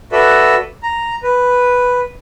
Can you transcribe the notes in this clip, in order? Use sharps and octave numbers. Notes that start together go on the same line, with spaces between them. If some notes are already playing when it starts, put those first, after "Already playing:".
F#4 A4 B4 D5 E5
A#5
B4